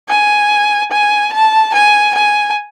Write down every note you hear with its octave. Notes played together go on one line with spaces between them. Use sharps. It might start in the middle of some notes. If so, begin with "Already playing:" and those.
G#5
G#5
A5
G#5
G#5